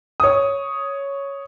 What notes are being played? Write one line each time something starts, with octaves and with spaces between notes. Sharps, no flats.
C#5 D#6